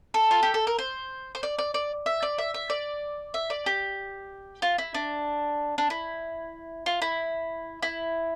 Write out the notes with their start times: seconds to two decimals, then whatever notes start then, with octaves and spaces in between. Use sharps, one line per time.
0.14 A4
0.31 F4
0.43 G4
0.54 A4
0.67 A#4
0.79 C5
1.35 C5
1.43 D5
1.59 D5
1.74 D5
2.06 E5
2.23 D5
2.38 E5
2.54 E5
2.70 D5
3.34 E5
3.50 D5
3.66 G4
4.62 F4
4.78 E4
4.94 D4
5.78 D4
5.90 E4
6.86 F4
7.02 E4
7.83 E4